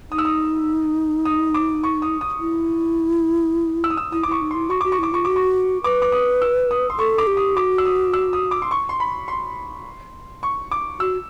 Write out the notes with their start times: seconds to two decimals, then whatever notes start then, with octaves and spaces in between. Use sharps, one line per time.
0.11 D#4 D#6
0.18 E6
0.25 D#6
1.25 D#6
1.54 D6
1.83 C#6
2.02 D#6
2.21 D#6
2.40 E4
3.84 E6
3.90 D#6
3.97 E6
4.12 E4 D#6
4.23 D6
4.27 E4 C#6
4.42 D#4
4.51 E4 C6
4.69 F#4 C#6
4.81 F#4 D6
4.92 C#6
4.99 E4 D6
5.13 F4 C#6
5.25 F#4 D6
5.36 C#6
5.84 B4 D6
6.02 D6
6.12 D#6
6.42 E6
6.71 D#6
6.90 C6
6.99 A4 C#6
7.18 D6
7.27 G4
7.37 D#6
7.56 F#4 D6
7.78 E6
7.85 D#6
8.13 E6
8.33 D#6
8.51 D6
8.62 C6
8.71 C#6
8.89 C6
9.00 B5
9.28 C6
10.43 C#6
10.71 D6
11.00 F#4 E6